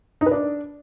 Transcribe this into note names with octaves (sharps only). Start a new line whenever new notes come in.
D#4
B4
D4